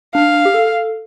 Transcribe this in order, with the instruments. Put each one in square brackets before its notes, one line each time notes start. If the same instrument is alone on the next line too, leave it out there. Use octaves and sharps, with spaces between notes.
[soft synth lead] D4 [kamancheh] F5
[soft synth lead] G4
A4